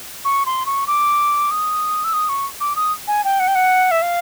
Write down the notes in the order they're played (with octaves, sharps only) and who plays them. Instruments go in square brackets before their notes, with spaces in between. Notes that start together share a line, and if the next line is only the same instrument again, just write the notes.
[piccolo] C#6
C6
C#6
D6
D#6
E6
D#6
C#6
D6
D#6
G#5
G5
F#5
G5
F#5
E5
F5